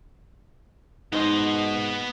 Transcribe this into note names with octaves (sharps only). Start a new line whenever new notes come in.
G#2 B3 D#4 C5 D#5